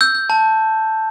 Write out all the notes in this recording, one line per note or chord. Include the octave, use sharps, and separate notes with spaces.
E6 G6
G6
A5